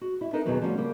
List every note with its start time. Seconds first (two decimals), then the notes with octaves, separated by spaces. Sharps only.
0.01 F#4
0.21 E4
0.33 B3 D4 D#4 A4 A#4 E5
0.45 E2 B2 D#3 E3 F#3 B3
0.62 F3 G3 A3 C#4 F#4
0.77 C#3 G3 A#3 C#4